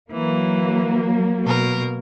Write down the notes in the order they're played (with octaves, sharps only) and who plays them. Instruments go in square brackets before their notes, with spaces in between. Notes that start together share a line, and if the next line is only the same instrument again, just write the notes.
[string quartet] E3 [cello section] F#3 A#3
[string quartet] B2 A#4